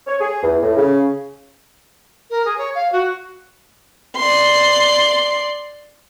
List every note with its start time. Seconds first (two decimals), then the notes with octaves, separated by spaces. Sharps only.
0.07 C#5
0.20 G#4
0.42 E2
0.63 A2
0.76 C#3
2.30 A#4
2.45 G#4
2.58 C#5
2.75 F5
2.92 F#4
4.17 D5 C6